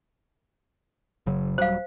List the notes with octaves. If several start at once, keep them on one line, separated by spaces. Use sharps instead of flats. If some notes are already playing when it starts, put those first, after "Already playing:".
F#1 C#3 F#3
D#1 F#3 G3 C5 F5